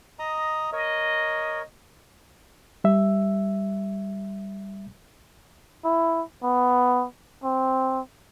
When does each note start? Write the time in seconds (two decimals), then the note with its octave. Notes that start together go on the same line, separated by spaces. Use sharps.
0.19 D#5 A#5 D#6
0.73 A#4 C#5 D#5
2.84 G3 E5
5.85 E4
6.43 B3
7.44 C4